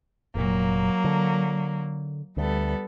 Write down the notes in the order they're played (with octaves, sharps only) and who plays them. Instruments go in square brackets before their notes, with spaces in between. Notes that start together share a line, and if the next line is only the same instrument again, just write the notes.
[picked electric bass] F1 A#2 [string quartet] F#3 A#3
[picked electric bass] D3
[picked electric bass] D2 [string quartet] G3 B3 A4